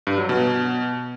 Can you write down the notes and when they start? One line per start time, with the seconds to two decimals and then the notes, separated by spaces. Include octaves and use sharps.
0.07 G2
0.18 F#3
0.29 B2